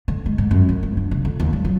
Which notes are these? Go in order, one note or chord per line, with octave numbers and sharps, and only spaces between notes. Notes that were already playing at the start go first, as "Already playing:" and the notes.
D3
G#3
G#2
F#2
D2
G2
D4
C#3
D3
D#2
G3
F#3